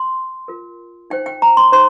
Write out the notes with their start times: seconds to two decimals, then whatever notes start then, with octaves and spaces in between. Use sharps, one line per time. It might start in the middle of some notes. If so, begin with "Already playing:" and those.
Already playing: C6
0.48 F4 A#4
1.10 D#4 C5 G5
1.26 G5
1.42 A#5
1.57 C6
1.72 D#4 C5 C6